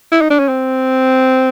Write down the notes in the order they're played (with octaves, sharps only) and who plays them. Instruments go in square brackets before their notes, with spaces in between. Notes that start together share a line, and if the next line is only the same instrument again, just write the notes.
[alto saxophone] E4
D#4
D4
C#4
C4